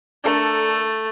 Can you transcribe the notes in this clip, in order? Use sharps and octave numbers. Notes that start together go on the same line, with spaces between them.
A3 D4 A4 A#4